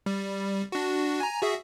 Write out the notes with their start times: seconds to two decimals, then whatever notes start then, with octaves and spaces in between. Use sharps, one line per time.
0.06 G3
0.72 D4 F#4
1.20 G#5 A#5
1.42 F#4 G#4 E5